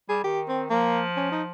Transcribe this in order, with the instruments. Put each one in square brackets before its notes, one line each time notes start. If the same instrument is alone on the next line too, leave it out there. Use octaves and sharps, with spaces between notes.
[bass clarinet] G3 [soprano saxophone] G#4
[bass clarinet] D#3 [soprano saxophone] G4
[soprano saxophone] C4
[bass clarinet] F3 [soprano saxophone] A#3
[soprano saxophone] C#4
D#4